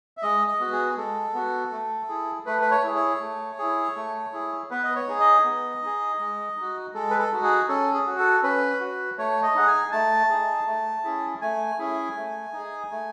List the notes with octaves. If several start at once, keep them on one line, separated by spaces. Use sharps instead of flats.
E5
G#3 D#5
D#5
B3 F#4
G#4
G#3 A4
B3 F#4
A3
E4 G#4
A3 B4
B4
C#5
E4 G#4
C#5
A3
E4 G#4
A3
E4 G#4
B3 B4
D#5
C#5
D#4 G#4
D#5
B3
D#4 G#4
G#3
D#4 F#4
G#3 A4
B4
A4
D#4 F#4
G#4
C#4 A4
G#4
F#4
A4
C#4 B4
F#4
A3 C#5
D#5
D#4 G#4 F#5
G#5
A3 A5
D#4 G#4
A3
C#4 E4 G#4
A3 G#5
C#4 E4 G#4
A3
D#4 G#4
A3